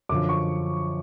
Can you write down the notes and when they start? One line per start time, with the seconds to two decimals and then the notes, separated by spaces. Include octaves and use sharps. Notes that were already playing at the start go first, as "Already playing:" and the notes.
0.09 F#2 D3 F3 D6
0.29 C#6